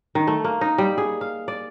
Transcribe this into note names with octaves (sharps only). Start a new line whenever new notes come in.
D#3
A3
A#3
D#4
G3
G#4
F5
D5